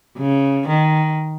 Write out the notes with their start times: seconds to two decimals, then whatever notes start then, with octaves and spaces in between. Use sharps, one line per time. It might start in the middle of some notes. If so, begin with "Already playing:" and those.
0.18 C#3
0.67 D#3